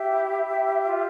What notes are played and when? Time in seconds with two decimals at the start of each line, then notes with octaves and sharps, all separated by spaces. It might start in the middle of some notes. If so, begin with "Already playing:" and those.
Already playing: G4 E5
0.09 E4
0.46 G4
0.84 F4